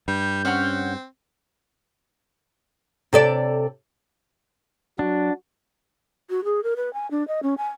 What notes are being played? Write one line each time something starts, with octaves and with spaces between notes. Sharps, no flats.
G2 G3 G6
C4 C#4 F#5 F6
C3 A4 D5
F#3 D4 F#4
F#4
G#4
A#4
B4
G#5
D4
D#5
C#4
G#5